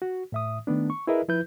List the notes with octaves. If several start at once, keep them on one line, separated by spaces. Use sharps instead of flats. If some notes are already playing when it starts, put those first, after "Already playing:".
F#4
A2 E5 D#6
D#3 A3 B3 D4
C#6
E4 G#4 A#4 B4 D#5 E5
F3 E4 B4 G6